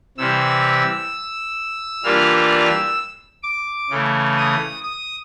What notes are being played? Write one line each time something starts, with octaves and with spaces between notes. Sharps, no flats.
C3 E3 G3 C4 E6
E3 G3 A#3 D4 F4 F6
F6
E6
D6
C#3 E3 A3
D#6
D#6